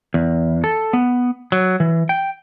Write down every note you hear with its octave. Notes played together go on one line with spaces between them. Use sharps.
E2
A4
B3
F#3
E3
G5